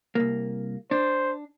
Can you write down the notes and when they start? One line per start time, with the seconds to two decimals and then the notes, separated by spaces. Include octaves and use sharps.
0.15 C2 A#3
0.91 D4 C5